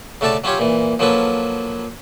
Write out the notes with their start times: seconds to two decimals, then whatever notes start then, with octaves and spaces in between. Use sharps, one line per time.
0.21 C#3 A3 F#4 A4 D5 A5
0.44 F#3 C#4 F4 G4 C#5
0.59 A#2 E3
0.99 F3 F#3 A#3 C#4 A4 B4